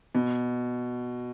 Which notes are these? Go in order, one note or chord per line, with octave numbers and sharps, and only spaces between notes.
B2